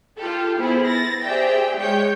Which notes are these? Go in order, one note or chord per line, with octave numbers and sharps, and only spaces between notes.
F4 G4 A4
B3 E4 G#4 C5
A6 A#6
G4 G#4 C5 D5 E5 G5
G#3 C#5 G5 G6